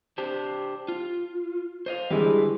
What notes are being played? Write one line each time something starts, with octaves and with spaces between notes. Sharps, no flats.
D4 G4 C5
F4
C5 D#5 F5
D3 G3 G#3 E4 B4